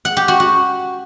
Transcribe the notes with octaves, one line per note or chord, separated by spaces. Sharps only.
F#5
G4
F#4
F#4